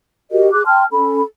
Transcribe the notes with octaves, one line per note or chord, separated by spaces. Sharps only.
F#4 G4 A#4 D#5
G#4 D6 F#6
G5 A5 C6 F6
C#4 A4 B5